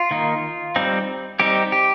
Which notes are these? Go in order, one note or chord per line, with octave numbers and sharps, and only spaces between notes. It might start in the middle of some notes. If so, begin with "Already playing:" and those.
Already playing: F4
D#3 A#3 D#4
G3 C4 D#4
G3 C4 D#4 G4
G4